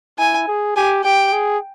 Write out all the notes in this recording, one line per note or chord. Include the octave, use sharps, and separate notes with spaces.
E4 G#5
G#4
G4 G#5
G4 G5
G#4